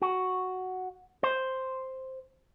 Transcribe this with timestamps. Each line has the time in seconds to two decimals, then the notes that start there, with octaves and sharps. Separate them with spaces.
0.02 F#4
1.23 C5